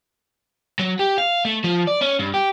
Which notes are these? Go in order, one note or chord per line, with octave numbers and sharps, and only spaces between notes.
F#3
G4
F5
A3
F3
D5
C#4
G2
G4